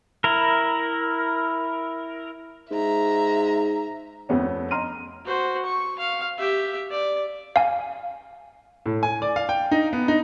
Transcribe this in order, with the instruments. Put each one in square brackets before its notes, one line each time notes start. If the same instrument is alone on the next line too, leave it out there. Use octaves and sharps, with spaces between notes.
[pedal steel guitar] E4 A#4
[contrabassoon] G#2 [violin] E5 A#5
[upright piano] F2 A3 B3 C#4
D#5 A#5 C6 F6 D#7
[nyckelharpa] F#4 C5
C#6
F5
G4 E5
D5
[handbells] F5 G#5
[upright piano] A2
G#5
D5
F5
G5
D#4
B3
D#4